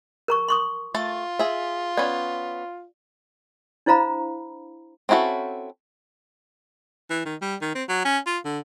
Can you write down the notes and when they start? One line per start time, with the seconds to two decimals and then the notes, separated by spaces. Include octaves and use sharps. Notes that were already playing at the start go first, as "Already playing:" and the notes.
0.28 A#4 A#5 C#6
0.48 C6 C#6 D#6
0.94 A3 F4 A4 A5
1.39 G#4 E5
1.98 B3 C#4 D5
3.86 D4 E4 C5 F5 A#5 B5
5.09 C4 C#4 E4 F#4 A4
7.10 E3
7.25 D#3
7.42 G3
7.61 D#3
7.75 C4
7.89 F#3
8.05 C#4
8.26 F4
8.45 D3